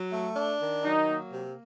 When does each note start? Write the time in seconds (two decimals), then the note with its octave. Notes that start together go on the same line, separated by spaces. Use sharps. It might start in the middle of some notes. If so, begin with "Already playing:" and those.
Already playing: F#3
0.11 A3
0.35 D4
0.60 D#3
0.84 F#3 D#4
1.09 A#3
1.33 C3